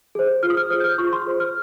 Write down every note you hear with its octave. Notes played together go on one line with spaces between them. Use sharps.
G#4 C5
F4 F6
D#6
F6
G#4 C5 F6
G6
F6
F4 C#6
C6
G#4 C5
F6